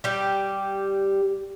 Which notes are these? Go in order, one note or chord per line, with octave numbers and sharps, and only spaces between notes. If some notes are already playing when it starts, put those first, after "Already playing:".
G3 G4